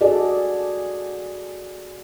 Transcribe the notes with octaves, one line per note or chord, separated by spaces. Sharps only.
F#4 G#4 A4 D5 D#5